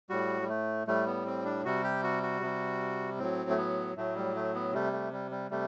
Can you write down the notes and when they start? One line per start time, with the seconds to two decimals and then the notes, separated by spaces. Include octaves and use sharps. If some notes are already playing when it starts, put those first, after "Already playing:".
0.10 A2 G3 F#4
0.41 G3
0.49 A3
0.87 A2 G3 A3
1.06 B3
1.26 C4
1.45 D4
1.65 C3 G3 F#4
1.84 G4
2.03 F#4
2.23 F#4
2.42 C3 G3
3.19 A2 F#3 C4
3.50 A3
3.57 B3
3.97 A2 F#3 A3
4.16 G3
4.35 A3
4.55 B3
4.73 C3 G3 A3
4.92 A3
5.12 G3
5.31 G3
5.51 C3 G3 A3